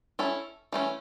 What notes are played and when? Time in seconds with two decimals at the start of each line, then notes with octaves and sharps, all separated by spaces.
0.19 C#4 E4 A4
0.72 E3 A3 C#4